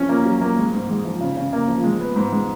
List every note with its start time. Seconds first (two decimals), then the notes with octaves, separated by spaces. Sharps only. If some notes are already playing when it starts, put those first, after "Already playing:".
Already playing: F3 C#4
0.09 A#3
0.25 F#3
0.41 A#3
0.58 G#3
0.73 G#2
0.89 G#3
1.05 F3
1.20 C#3
1.37 C#3
1.53 A#3
1.68 F3
1.84 G#3
2.00 B3
2.16 G#2
2.32 G#3